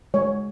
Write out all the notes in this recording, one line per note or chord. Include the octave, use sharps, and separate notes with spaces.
G#3 C#5